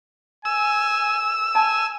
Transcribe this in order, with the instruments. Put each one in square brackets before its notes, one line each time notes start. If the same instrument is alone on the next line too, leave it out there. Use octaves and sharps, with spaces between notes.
[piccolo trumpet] G#5 [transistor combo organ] E6
[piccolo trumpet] G#5 [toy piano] A5